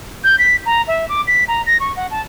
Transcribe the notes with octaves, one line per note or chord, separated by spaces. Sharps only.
G6
B6
A#5
E5
D6
B6
A#5
A#6
C#6
F#5
A5